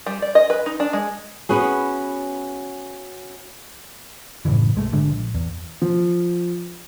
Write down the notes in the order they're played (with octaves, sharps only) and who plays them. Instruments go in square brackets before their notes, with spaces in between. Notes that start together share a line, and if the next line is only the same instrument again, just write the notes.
[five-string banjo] G3
D5
D#5
B4
D#4
D4
G#3
[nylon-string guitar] B3 C#4 F#4 G#4
[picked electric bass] F#2 A2 C#3 E3
B1 G#3 A3
G#1 D3 G#3 D4
A#1
E2
[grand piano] F3